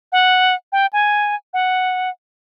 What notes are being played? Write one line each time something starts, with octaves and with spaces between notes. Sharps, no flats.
F#5
G5
G#5
F#5